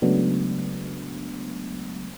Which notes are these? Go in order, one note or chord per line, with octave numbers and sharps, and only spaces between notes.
C#3 F#3 G#3 A3 B3 D4